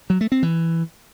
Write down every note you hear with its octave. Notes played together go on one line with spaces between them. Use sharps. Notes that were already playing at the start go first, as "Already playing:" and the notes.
F#3
A3
C4
E3